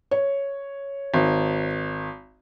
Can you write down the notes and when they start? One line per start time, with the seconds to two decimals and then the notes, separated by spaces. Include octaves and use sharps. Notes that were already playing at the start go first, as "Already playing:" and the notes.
0.11 C#5
1.14 G#1